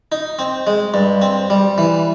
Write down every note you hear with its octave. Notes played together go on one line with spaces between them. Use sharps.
D#4
C4
G#3
G2
C4
G3
E3